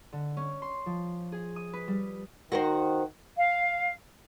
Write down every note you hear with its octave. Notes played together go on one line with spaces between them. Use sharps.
D3
C#4
C6
F3
G#4
D#6
B4
G3
D#3 F#4 A#4 C5
F5